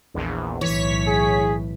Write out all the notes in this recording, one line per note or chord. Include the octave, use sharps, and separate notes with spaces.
A#1 E2
B1 A2 E3 C#5 B6
G#4